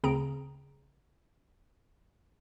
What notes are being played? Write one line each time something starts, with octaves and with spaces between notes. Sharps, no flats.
D2 C#3 C4 G#4 A#5 D7